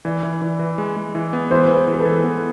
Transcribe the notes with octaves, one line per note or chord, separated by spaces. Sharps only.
E3 D5
E3
E3
E3
G#3
G#3
E3
B3
E3 C5
G#3 B4
C5
E3
B4
A4
E3
B3